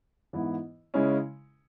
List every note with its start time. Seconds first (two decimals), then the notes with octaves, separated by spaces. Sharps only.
0.33 G#2 E3 B3 E4
0.94 C#3 G#3 C#4 E4